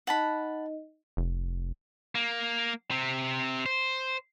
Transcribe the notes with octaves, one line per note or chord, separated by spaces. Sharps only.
D#4 D#5 F#5 A5 B5
F1
A#3
C3 C4
C5